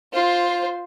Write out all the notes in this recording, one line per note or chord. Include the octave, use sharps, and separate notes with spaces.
F4 C5